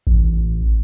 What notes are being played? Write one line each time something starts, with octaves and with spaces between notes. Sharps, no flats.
A1